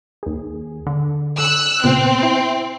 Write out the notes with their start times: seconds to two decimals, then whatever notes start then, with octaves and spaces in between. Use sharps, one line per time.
0.23 D#2 G#4
0.87 D3
1.38 D3 E6 F#6
1.84 A#2 C#3 B3 C4
2.23 E4